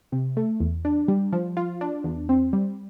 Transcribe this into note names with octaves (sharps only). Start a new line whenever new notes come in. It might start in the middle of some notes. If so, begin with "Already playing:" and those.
C3
A3
E2
D4
G3
F3
F4
D4
E2
C4
G3